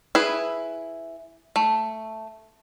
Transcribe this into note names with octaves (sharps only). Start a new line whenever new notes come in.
E4 G#4 B4
A3